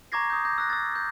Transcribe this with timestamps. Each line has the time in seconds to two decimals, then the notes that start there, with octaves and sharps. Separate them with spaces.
0.12 A#5 C#6 D6 G#6 A#6 C7
0.30 D#6 G6
0.45 D6 G6 A#6
0.58 E6 F#6 A#6
0.70 E6 A6
0.96 G6